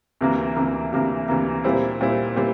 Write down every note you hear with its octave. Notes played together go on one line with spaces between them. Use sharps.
D2 C3 E3 A#3
D2 C3 E3 A#3
D2 C3 E3 A#3
D2 C3 E3 A#3
A#2 G3 C4 E4
A#2 G3 C4 E4
A#2 G3 C4 E4